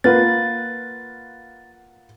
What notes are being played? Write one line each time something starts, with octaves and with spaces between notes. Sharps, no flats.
A#3 F4 B4 F#5 A6